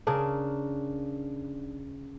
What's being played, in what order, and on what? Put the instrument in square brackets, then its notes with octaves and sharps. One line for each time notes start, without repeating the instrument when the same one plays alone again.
[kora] C#3 D4 A#4